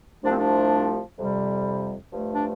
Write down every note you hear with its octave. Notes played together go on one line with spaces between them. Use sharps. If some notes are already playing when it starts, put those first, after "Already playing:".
C2 C3 F3 A3 D4
C4
D4
F2 C3 G3
G2 F3 A3
D4